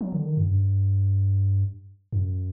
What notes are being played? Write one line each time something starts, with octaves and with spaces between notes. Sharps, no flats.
F#3
D3
D#3
F#2
G2
F#2